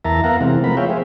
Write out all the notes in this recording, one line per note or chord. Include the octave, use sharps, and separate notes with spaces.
E2 A#4 E5 A5 A#5
B3 A#4 F5 F#5 A#5
C3 E3 G#3 C4
F3 A3 B3 A#4 B5
G#4 C#5 E5 F5 G5
G#4 C5